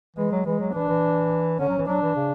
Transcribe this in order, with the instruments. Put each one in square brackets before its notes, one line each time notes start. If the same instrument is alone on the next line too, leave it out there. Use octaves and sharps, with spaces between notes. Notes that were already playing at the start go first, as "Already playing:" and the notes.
[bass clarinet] E3 [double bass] G#3
[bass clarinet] F#3
[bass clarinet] E3 [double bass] G#3
[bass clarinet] F#3
[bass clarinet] E3 [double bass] D4
[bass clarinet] E3
[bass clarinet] D3 [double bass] C#4
[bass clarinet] F#3
E3
[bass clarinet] F#3 [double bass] D4
[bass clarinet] E3
C#3